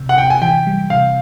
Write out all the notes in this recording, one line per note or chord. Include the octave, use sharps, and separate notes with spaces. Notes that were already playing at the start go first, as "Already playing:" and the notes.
Already playing: C3
F#5
C3 G5
G#5
E3 G5
G3
C3 F5